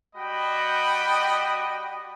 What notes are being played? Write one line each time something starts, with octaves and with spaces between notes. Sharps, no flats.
G3 F#4 D#5 G5 B5